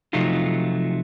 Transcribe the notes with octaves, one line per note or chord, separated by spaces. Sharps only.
C3 F3 F#3 A3 D#4 F4